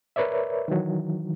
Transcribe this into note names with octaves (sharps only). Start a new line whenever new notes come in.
A#4 B4 C#5 D5 E5
D#3 E3 F#3